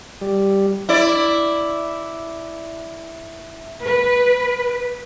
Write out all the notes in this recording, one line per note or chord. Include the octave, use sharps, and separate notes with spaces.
G3
E4 D5
B4